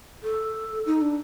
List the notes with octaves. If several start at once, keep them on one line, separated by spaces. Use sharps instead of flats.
A4
D#4
D4